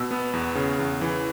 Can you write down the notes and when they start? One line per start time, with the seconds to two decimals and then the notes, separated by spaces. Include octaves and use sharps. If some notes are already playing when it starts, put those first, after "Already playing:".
Already playing: B2 E6
0.11 B3
0.33 E2
0.55 C#3
0.79 E2
1.01 E3